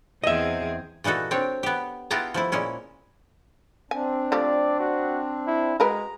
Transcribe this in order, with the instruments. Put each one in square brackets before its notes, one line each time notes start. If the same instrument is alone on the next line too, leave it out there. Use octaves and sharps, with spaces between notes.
[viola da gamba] E2 C4 G#4 [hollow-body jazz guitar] D#5 E5
[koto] A#2 E3 D#4 F#4 A4
C4 D4 C#5
B3 G4
B3 E4 F4 G4 A5 A#5
F3 A3 E4
A#2 G#3 C#4 E4
[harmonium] C4 D4 [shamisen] G#5
[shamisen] F3 A3 G4 [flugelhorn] D5
[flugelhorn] F#4
E4
[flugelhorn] G#3 [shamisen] F#4 A#4 B4 [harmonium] A#5